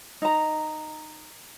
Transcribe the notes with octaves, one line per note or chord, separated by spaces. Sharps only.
D#4 A#5